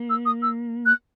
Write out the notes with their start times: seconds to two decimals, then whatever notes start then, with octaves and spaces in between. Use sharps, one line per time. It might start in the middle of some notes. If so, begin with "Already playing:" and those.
Already playing: A#3
0.10 E6
0.26 D#6
0.42 E6
0.86 F#6